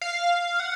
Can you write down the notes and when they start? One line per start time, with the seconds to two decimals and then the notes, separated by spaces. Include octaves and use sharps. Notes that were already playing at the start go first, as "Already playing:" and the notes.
0.01 F5
0.60 F#5